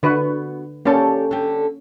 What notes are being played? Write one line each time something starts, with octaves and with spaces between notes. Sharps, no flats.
D3 B3 F#4 B4
A#3 C#4 G4 A4 D5
D3 G4